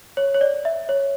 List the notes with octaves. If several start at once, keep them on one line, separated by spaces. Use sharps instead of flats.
C#5
C#5
D5
E5
C#5